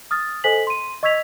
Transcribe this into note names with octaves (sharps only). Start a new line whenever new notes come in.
D#6 F6 A6
A4 C5 D#5 G#5 B6 F#7
C6 D#7
D#5 C#6 E6 G#6 B6 F7